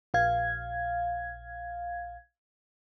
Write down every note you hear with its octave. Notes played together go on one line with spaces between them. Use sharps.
A#1 F5 G#6